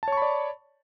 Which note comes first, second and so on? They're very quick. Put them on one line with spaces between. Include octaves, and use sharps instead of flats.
A5 C#5 C#6 B5 D5